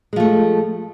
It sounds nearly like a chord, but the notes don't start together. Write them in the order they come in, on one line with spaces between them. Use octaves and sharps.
G#3 F3 A3